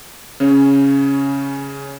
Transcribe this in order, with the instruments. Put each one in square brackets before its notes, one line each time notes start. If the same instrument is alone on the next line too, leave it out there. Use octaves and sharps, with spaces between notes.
[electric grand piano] C#3 C#4